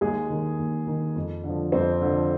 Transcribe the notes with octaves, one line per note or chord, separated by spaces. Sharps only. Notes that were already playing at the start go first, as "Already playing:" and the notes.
D#2 G#3 G#4
D#3
D#2
D#3
F2
D3
F3
F2 C4 C5
D3 F3